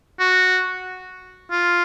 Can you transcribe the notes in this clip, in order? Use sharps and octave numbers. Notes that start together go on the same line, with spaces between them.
F#4
F4